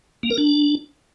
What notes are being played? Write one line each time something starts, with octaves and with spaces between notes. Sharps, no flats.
A#3
A#4
D4